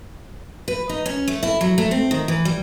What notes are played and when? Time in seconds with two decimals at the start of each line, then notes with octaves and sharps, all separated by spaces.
0.68 B4
0.89 D#4
1.06 C#4
1.28 A3
1.43 E4
1.61 F#3
1.78 A3
1.91 C4
2.11 D#3
2.28 E3
2.45 G3